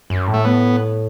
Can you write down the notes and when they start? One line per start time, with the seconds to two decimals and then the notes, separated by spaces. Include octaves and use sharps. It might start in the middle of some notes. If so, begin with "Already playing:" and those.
0.10 F#2
0.27 A2
0.34 A3
0.45 B3